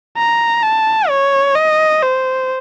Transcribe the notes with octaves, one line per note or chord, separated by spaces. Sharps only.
A#5
A5
C#5
D#5
C5